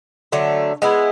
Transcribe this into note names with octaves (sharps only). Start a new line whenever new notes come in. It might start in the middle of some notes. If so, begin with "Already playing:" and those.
D3 F#3 A3
G#3 B3 E4